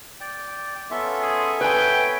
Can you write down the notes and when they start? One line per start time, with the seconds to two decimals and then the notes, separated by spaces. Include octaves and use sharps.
0.21 D5 G5
0.91 B3 C#4 F4 A4 E5
1.22 G#4
1.61 B4 C#5 G5 G#5 B5